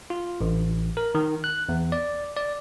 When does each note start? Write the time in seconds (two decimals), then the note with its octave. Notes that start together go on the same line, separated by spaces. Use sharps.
0.10 F4
0.41 A1
0.97 A#4
1.15 D#3
1.44 F#6
1.69 E2
1.92 D5
2.37 D5